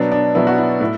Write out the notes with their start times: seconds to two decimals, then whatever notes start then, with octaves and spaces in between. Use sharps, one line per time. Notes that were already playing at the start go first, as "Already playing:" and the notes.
Already playing: B2 F#3 B3 D4
0.12 D4
0.35 B2 F#3 B3 E4
0.47 F#4
0.58 E4
0.80 A2 E4